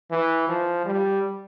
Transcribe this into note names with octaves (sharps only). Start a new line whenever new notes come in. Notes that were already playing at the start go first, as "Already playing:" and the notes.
E3
F3
G3